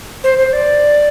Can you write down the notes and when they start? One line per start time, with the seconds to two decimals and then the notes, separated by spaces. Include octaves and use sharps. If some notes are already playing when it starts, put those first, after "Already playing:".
0.24 C5
0.38 C5
0.53 D5